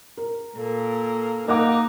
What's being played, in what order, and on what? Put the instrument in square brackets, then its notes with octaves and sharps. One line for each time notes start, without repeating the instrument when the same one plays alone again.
[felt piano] A#4
[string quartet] A#2 A#3 [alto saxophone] A4
[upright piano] A#3 [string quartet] D#4 [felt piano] D#5 F#5 D6